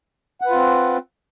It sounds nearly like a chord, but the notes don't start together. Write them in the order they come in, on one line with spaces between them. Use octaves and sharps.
F#5 B4 F4 C4